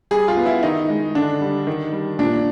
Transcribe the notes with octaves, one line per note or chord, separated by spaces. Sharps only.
G3 G#4
F4
B3
E4
D#3 D#4
G#3
D3 D4
G3
D#3
G3
A#2 D4